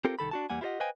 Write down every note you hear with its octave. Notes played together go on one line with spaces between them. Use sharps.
C4 F4 G4 A4 A#4
C2 D#3 A4 B5
D4 F#4 A5
E2 G3 A#3 F#5 G#5
E4 F4 G4 A4 D#5 F#5
B4 C5 D#5 F5 G5 G#5